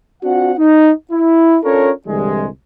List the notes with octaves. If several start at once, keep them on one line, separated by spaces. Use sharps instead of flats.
C4 D4 F4 F#4 F#5
D#4
E4
C#4 D4 F4 A4 A#4 C#5
C2 D3 E3 G3 G#3